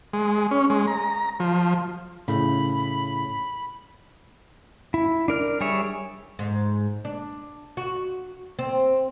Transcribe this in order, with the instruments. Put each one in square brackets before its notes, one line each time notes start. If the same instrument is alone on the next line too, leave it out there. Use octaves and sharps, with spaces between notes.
[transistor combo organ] G#3
C#4
G#3
A#5
F3
[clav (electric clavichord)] A2 C#3 [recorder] B5
[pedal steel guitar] E4
D4 A#4 F6
G3 G#4 C#5 E5
[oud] G#2
D4
F#4
C4